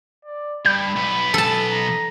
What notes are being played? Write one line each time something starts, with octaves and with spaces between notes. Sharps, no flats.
D5
G2 B5 G6
B1 B3
A4 A5
A#5